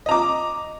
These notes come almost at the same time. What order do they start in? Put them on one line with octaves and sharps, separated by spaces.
D#5 A#5 D6